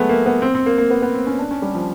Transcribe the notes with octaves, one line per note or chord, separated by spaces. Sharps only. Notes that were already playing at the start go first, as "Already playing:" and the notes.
Already playing: F#3 G#3 A3 B3
A#3
B3
C4
C4
A#3
A#3
B3
B3
C4
C#4
D4
C#4
G3
F3